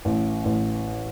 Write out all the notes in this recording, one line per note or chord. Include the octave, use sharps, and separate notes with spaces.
A1
A1